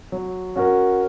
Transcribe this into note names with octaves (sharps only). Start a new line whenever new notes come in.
F#3
C#4 F#4 A#4